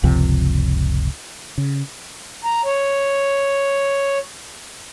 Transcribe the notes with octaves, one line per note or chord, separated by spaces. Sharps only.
F#1 C#2 C3 F3
C#3
A#5
C#5